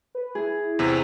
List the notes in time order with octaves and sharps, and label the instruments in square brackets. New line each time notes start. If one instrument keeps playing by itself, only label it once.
[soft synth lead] B4
[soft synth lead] E4 [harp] G#4
[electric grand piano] E2 C3